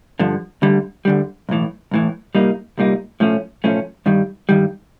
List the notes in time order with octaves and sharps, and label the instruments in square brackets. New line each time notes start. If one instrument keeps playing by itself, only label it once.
[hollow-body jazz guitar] G2 D3 F3
D2 D3 G3
D2 D3 G3
B1 A2 E3
B1 A2 E3
C2 A#2 G3 A#3 D#4
C2 A#2 G3 A#3 D#4
B1 A2 F3 A3 C#4
B1 A2 F3 A3 C#4
G2 D#3 G3
G2 D#3 G3